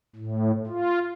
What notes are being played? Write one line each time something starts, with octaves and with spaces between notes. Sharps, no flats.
A2
F4